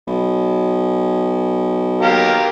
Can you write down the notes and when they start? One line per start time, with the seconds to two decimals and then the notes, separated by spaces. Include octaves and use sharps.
0.07 B1
2.02 G4 A#4 F5